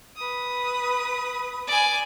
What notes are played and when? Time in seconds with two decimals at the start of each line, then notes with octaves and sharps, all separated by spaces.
0.15 B4 D#6
1.67 D5 G#5